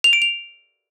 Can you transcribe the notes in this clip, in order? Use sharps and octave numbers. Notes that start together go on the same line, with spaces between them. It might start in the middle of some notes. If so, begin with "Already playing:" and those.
F7
D7
F7